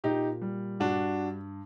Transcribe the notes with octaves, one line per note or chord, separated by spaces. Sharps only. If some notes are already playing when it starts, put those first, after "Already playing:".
A#2 D#4 G4
G3
G2 D4 F#4